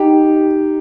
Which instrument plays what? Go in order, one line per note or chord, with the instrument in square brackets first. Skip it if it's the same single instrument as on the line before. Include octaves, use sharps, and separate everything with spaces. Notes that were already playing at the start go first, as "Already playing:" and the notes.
Already playing: [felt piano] D#4 G4